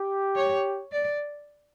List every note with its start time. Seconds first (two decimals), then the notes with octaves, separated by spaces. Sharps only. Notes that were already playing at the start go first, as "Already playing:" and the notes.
Already playing: G4
0.36 C#5
0.92 D5